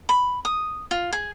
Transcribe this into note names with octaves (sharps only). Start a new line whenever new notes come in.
B5
D#6
F4
G#4